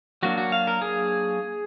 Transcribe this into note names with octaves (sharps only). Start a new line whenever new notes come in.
F#3 A#3 D4 F#4
F#4
F5
A#4
G#4